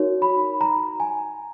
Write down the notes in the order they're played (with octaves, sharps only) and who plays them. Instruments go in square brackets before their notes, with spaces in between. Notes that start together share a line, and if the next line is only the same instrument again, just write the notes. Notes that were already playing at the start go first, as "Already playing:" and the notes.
Already playing: [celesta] D#4 F#4 A#4 C#5
B5
A#5
G#5